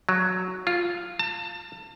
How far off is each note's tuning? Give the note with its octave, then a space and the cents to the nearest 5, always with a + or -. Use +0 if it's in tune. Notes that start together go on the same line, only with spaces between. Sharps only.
F#3 +0
F4 +0
A5 +30